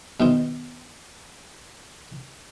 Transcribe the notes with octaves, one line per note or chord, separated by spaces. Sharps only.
B2 D#3 C5